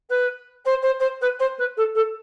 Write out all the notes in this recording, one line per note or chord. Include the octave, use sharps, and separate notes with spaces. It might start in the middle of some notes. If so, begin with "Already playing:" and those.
B4
C5
C5
C5
B4
C5
B4
A4
A4